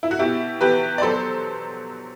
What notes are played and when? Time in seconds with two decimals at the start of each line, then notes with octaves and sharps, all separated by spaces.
0.03 E4
0.11 F#4
0.19 B2 E4 G4
0.61 E2 G4 B4
0.98 D5
1.02 F#3 A4 C5